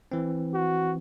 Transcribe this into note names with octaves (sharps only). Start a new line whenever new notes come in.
E3 C4
F#4